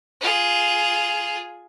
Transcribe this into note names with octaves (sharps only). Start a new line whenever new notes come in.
F4 G#4